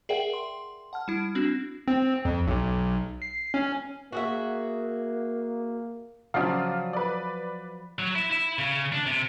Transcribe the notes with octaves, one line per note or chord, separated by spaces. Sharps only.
G#4 A#4 D5 E5 F#5 G5
C6
F#5 A5 F6
G3 E4
C4 D4 F#4
C4
F2
B1
C7
C#4
A#3 F#4 G#4 E5
C#3 F3 F#3 D5 F5
B4 D5
F#3
E4
E4
C#3
D4
C3